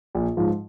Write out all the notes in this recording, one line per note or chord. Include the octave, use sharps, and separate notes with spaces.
A#1
G#2 F3